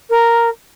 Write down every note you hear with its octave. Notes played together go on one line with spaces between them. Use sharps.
A#4